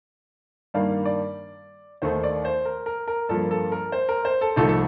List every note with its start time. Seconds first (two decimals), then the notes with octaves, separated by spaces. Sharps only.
0.74 G2 D#3 G3 A#3 F5
1.05 D5
2.02 D#2 D#3 A3 D#4 C5
2.23 D5
2.45 C5
2.65 A#4
2.86 A#4
3.08 A#4
3.29 G2 F3 A#3 A4
3.51 A4
3.72 A#4
3.92 C5
4.09 A#4
4.25 C5
4.41 A4
4.56 C2 C3 F3 A3 D#4 A4
4.69 A4